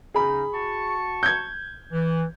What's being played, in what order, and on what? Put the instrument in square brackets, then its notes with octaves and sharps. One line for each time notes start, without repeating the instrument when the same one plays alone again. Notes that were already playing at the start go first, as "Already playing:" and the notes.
[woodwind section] C#3 C#4 D#4 [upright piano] G#4 B5
[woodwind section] F#4 A5 C#6
[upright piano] G6 G#6
[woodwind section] E3